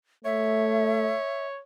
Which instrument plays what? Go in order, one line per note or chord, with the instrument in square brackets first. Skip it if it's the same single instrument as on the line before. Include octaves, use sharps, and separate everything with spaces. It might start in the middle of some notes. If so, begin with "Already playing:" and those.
[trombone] A3 [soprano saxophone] C#5 [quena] E5